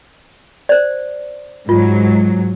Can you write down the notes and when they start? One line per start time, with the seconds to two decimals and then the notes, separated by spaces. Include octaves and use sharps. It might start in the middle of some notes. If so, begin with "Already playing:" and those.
0.69 C5 D5
1.69 G#2 F#3 F4